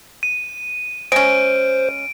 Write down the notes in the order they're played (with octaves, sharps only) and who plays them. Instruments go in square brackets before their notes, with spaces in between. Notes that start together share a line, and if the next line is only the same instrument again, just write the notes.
[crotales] D#7
[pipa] G#3 C#4 [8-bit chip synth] C5 [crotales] D7